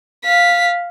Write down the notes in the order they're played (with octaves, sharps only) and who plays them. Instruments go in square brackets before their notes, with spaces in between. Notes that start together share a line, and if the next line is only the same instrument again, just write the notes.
[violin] F5 B6